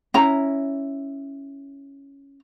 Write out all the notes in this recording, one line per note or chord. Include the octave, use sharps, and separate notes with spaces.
C#4 E4 A#5